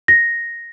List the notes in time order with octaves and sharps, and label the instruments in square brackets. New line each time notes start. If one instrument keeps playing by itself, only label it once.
[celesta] A#6